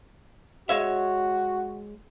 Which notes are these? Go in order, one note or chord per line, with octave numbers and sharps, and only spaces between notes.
G#3 F#4 C#5 E5